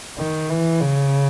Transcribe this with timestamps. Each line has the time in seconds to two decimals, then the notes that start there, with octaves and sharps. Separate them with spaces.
0.18 D#3
0.49 E3
0.80 C#3